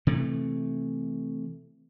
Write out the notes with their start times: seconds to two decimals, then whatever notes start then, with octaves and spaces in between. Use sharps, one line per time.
0.07 C3 E3 A3